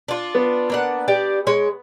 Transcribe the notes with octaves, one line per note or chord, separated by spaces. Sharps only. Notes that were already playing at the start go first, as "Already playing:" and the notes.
D4 F4
B3
A#3 D4 F#5
D4 G4 D5
G#3 C#5